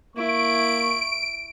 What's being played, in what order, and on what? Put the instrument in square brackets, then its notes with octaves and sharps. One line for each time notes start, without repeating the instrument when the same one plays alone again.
[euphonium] A#3 [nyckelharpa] E4 [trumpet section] C#6 [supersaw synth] D7